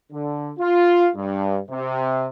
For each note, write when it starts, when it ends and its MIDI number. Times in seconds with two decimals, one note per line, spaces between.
0.12 0.50 50
0.59 1.08 65
1.16 1.58 43
1.69 2.27 48